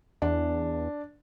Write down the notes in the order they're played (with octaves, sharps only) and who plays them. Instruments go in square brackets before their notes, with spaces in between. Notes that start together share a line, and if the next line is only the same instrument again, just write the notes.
[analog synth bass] E2 [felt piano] D4